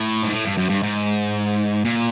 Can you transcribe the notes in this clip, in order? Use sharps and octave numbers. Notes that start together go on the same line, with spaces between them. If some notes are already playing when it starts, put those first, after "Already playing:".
Already playing: A2
G#2
A2
G2
F#2
G2
G#2
A#2